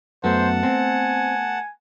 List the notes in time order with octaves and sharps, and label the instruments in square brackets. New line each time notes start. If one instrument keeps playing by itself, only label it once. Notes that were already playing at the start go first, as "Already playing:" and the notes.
[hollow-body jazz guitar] F#2 [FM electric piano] A3 B3 [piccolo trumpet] C5 [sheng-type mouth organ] F#5 A5
[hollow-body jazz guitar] C4 [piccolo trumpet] G#5